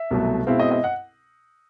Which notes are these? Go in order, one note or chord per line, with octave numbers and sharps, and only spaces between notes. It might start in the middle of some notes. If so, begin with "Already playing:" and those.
Already playing: E5
C2 B2 F#3 A3
B2 G#3 C4 E4 F5
D#5
D#5
F#5